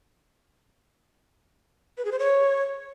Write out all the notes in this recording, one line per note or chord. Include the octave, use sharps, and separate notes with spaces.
B4
G#4
C5
C#5